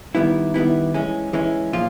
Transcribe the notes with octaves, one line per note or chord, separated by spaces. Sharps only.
D#3 G3 B3 E4
D#3 G3 B3 E4
E3 G#3 C#4
E3 G#3 C#4
A#2 F3 F4